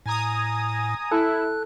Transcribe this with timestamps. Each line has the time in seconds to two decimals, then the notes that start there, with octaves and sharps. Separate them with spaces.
0.06 A2 G#5 A#5 D#6
1.12 E4 A4 F#6